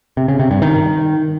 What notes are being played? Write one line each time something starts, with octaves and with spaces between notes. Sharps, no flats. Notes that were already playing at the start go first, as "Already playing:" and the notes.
C3
C#3
C3
G2
D#3